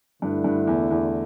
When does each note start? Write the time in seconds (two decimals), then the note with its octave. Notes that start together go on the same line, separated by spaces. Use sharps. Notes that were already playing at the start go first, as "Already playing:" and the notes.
0.22 G2 D3 A3 E4
0.44 G2
0.67 E2
0.90 E2